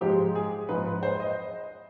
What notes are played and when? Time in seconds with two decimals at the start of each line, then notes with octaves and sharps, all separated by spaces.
0.01 G#2 F3 G#3 G4
0.35 G#4
0.69 G#2 F3 G#3 B4
0.86 B4
1.03 C5
1.20 D#5